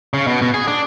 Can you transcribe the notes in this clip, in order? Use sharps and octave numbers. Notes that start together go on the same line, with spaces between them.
C#3
B2
B2
G#4
D4